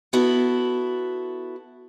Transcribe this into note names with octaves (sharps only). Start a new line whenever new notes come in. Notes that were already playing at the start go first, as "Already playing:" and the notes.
B3 E4 F#4 A4